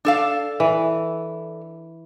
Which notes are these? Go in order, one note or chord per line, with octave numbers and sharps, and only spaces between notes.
D4 A4 F5
E3